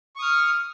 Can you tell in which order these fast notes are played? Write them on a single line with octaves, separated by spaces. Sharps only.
C#6 D#6 F6